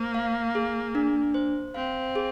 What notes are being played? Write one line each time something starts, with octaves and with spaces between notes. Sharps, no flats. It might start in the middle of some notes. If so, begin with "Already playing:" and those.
Already playing: A#3 C5
F5
G#4
D4
C5
C4 F5
G#4